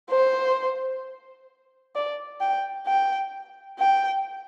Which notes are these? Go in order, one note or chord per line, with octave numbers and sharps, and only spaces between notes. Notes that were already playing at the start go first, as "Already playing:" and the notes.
C5
D5
G5
G5
G5